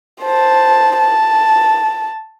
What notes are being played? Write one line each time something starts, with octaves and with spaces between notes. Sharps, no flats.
C5 A5
A5